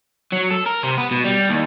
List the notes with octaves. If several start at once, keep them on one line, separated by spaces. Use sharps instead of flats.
F#3
A4
A#4
C3
B3
B2
G3
D#2